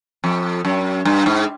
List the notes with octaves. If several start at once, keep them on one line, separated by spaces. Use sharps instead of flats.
F2
F#2
G2
G#2